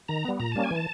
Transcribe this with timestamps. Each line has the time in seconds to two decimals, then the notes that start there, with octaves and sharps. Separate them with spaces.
0.08 D#3 A#5
0.25 G3 B3
0.39 A#2 A#5
0.52 G3 A#3 C#4 A5
0.64 G#5
0.71 E3
0.76 A5